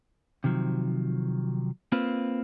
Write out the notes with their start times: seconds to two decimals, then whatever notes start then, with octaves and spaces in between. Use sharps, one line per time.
0.44 C3 D#3 F3 F#3
1.92 A#3 C4 F4 B4